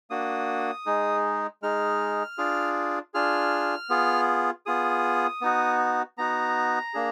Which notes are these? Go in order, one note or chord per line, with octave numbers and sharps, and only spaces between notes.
A#3 D4 F#4 D#6
G#3 D#4 G#4
G#3 D#4 G#4 F6
D4 F4 G#4
D4 F4 G#4 F6
B3 F4 G#4
B3 F4 G#4 D#6
B3 D#4 F#4
B3 D#4 F#4 A#5
A#3 D4 G#4